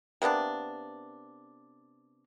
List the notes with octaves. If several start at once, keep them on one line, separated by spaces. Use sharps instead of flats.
C3 A#3 B3 D4